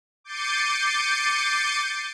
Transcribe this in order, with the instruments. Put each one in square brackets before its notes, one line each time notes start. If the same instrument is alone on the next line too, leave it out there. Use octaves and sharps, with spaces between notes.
[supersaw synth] D6 G6 A6 C7 C#7 D#7